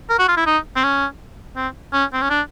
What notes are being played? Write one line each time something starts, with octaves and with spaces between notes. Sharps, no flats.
A#4
F#4
F4
E4
D#4
C4
C#4
C4
C#4
C4
C#4
D4